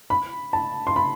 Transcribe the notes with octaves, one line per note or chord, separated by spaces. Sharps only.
B5
A5
C6
B5